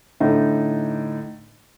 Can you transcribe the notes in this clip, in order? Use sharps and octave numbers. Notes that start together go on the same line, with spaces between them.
A2 D3 D#4